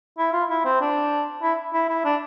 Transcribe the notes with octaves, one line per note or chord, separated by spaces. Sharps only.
E4
F4
E4
C4
D4
E4
E4
E4
D4